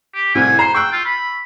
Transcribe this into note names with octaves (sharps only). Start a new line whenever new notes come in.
G4
C2 A2 C3 G#5
C5 A#5 C7
G5 C#6 E6 F#6
F4
B5